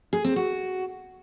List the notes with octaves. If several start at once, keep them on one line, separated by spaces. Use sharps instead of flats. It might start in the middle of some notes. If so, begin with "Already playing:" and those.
G#4
C4
F#4